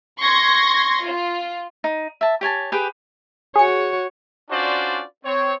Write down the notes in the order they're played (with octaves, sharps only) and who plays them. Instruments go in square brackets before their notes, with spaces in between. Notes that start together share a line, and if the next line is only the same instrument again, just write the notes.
[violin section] C6 C#6 G#6 A#6
F4
[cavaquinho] D#4
E5 A5
G4 C#5 G#5 A5
G4 G#4 B4 G5
[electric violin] F#4 C#5 [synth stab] G#4 C#7
[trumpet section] C#4 D4 F4 F#4 C5 D5
C4 C#5